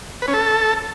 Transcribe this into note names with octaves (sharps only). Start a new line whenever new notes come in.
B4
C#4
A4